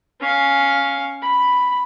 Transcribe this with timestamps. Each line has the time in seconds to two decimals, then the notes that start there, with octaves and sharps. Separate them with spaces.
0.21 C#4 F5
1.22 B5